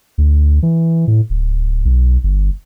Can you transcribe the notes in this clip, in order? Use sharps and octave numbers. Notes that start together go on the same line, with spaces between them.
D2
E3
A2
D1
B1
G1